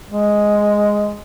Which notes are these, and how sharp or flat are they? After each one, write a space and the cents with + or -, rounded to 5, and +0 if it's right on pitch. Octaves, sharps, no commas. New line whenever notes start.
G#3 +0